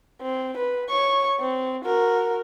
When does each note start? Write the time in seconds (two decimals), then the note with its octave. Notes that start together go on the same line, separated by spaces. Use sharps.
0.22 C4
0.58 B4
0.89 C#5 C#6
1.40 C4
1.85 F#4 A#4